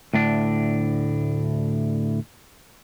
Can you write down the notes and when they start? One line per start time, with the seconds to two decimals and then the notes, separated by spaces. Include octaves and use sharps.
0.14 D2 A2 D4